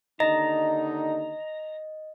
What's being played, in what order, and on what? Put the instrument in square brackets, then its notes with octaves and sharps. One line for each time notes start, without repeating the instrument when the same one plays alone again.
[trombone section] D#2 D3 D#4 [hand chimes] D#5 [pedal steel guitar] A#5